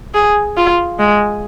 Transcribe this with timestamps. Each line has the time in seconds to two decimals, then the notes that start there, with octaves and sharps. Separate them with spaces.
0.15 G#4
0.57 F4
0.99 G#3